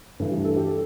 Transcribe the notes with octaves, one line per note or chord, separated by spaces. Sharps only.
G2 E3 A3 A4
G4
A4
G4
A4